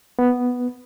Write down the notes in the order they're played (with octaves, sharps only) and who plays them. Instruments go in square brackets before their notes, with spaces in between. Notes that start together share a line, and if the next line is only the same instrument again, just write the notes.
[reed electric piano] B3